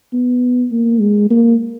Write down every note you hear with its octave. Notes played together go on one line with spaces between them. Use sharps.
B3
A#3
G#3
A#3